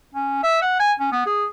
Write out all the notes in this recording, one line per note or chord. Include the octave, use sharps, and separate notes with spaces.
C#4
E5
F#5
G#5
C#4
B3
G#4